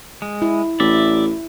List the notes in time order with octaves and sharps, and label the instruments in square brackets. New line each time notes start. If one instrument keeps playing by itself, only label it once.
[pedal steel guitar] G#3
[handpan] E4
[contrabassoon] A1 [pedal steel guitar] D5 E5